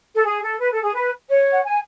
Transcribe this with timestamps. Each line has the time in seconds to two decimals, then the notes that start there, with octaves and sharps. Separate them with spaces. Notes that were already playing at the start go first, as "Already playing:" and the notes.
0.16 A4
0.25 G#4
0.42 A4
0.60 B4
0.71 A4
0.83 G#4
0.94 B4
1.29 C#5
1.51 F#5
1.63 G#5